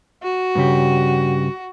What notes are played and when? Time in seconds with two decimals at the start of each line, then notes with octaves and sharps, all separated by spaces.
0.23 F#4
0.55 G2 C#3 G4